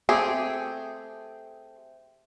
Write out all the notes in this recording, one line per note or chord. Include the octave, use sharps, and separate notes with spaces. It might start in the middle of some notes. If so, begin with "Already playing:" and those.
A3 C4 G4 G#4